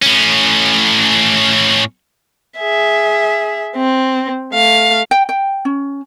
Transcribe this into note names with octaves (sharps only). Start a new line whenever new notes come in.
A2 C#4
G#4 E5
C4
A3 F5
G5
G5
C#4